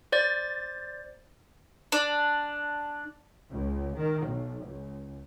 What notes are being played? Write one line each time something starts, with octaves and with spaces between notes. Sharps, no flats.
C5 D5 A6
D4
C#2
D#3
B1
C#2